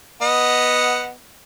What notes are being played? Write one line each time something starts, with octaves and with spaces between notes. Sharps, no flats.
B3 D#5 F#5